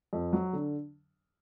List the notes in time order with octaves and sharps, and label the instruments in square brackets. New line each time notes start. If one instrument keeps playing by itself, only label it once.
[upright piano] F2
F#3
D3